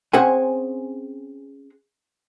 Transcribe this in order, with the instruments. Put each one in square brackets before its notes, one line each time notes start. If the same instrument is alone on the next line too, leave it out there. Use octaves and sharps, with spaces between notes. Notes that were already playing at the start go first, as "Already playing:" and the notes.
[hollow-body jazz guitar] C4 C#4 G#4 C5 F#5 G#5